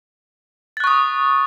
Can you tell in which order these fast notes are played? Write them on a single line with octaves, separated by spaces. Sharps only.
A6 F#6 C#6 D#6